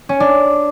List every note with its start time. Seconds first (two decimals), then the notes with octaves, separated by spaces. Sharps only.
0.09 C#4
0.20 D4